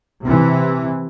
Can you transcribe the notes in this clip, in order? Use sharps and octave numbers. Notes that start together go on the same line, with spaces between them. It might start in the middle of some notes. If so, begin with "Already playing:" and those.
C3 E3